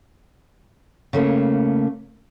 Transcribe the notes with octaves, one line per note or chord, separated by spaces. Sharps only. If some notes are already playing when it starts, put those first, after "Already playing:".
C#3 A3 A#3